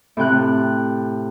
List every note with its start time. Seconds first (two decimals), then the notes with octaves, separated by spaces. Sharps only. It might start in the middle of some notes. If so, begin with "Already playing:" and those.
0.17 A2 C3 G5 F#6